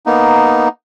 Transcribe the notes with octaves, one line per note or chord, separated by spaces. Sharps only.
A#3 B3 D#4